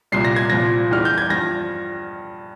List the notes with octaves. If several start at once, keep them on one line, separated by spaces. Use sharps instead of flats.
C2 A#2 G3 C7
A#6
G#6
C2 A#2 F3 A#6
E2 E3 G3 F6
G6
G#6
G2 F3 A#6